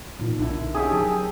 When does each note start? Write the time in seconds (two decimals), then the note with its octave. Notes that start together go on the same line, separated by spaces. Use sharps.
0.19 A#2 D#4
0.39 B1 D3 D#3 E4
0.75 C#4 D#4 G4 G#4 E6
0.91 D#3 F#3 G4 A5